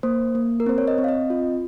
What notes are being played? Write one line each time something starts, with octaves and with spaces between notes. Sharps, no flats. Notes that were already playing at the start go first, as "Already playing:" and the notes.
A#3 C5
A#3
A#4
C4 C5
C#5
D#5
C4
F5
D#5
F4